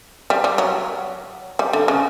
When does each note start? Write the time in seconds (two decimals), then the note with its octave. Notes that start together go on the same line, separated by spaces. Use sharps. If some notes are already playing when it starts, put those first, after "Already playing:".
0.30 G3
0.44 G3
0.58 F#3
1.59 G3
1.73 D3
1.88 C#3